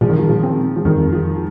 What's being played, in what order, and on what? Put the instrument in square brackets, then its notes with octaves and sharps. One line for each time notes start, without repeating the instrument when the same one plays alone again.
[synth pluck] A#2 [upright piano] F3
[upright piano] D#3
F3
F3
[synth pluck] C4
[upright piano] F3
[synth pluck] F2 [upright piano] D#3
[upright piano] F3